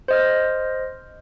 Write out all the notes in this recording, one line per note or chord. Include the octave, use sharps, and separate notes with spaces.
C5 D#5 F6